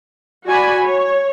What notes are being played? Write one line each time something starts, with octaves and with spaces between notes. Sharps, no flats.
F#4 D5 G#5 B5
C#5